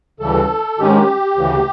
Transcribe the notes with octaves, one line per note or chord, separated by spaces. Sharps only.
D2 C#3 E3 G3 A4
G#2 D#3 G#3 C#4 G4
D2 C#3 E3